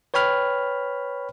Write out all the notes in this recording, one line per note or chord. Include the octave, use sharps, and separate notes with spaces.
B4 C#5 G5 B5 F6